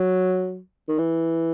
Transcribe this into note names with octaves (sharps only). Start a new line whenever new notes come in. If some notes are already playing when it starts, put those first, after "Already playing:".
Already playing: F#3
D#3
E3